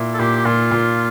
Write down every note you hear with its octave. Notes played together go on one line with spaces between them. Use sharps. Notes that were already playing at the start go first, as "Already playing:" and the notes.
Already playing: A#2 E4
A4
A#2 G4
A#2 F4
A#2